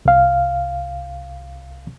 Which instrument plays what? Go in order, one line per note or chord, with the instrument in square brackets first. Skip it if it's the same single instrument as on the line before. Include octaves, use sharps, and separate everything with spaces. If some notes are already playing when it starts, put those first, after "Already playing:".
[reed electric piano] C2 F5